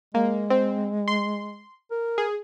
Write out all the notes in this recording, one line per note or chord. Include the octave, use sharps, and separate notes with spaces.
G#3 A#3
C4
C6
A#4
G#4